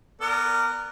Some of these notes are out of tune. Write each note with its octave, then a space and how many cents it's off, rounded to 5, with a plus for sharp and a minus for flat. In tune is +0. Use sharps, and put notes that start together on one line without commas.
B3 +0 A#4 -15 D5 +0